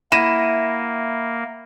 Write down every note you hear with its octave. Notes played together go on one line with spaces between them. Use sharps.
A#3 E4 E5 F#5 A#6 D#7 E7